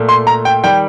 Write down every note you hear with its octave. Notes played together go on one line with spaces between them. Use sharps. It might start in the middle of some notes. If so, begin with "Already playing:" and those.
Already playing: A#2 A3
C6
A#5
G5
D#3 G3 G5